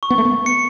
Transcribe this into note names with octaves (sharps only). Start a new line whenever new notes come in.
C#6
B3
A3
B3
C#7